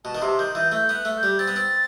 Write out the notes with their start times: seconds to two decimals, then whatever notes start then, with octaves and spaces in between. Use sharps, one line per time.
0.05 B2 A5
0.15 D#3
0.22 C3 C6
0.39 D#3 G6
0.55 E3 G6
0.72 A3 G6
0.89 B3 F#6
1.05 A3
1.17 G6
1.23 G3
1.39 C4 A6
1.48 B3
1.56 C4